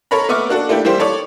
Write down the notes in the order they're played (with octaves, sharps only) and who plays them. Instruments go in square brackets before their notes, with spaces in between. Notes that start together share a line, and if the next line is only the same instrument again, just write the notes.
[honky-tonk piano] A4 A#4 C#5 A#5 B5
A3 B3 E5 C#6 D6 F6
A#3 D4 F#4 A4
A3 A#3 D4 E4 G4
E3 G3 A#3 E4 G4 C5
A4 C#5 D5 D6